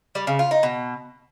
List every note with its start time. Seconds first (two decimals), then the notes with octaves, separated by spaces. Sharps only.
0.15 G3
0.27 C#3
0.39 F4
0.51 D#4
0.63 B2